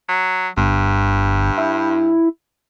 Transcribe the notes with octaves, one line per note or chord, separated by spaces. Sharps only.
F#3
G1 G2
E4